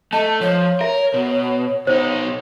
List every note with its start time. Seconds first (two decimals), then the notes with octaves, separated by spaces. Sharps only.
0.13 A3 D#5 A5
0.41 F3 C#5
0.81 A#4 E5
1.14 B2
1.87 B2 D#4 C5